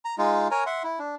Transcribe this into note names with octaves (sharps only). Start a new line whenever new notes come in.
A#5
G#3 D#4 F4
A#4 C#5 G#5 A#5
E5 F#5 C6
E4
D4